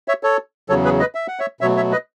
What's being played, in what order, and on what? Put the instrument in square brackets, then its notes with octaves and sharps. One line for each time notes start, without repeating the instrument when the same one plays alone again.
[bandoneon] C#5 E5
A4 C#5
E2 C#3 F#3 A4 C#5
G#4 B4
B4 D#5
E5
F#5
C#5 E5
B2 F#3 A3 C#5 E5
C#5 E5
B4 D#5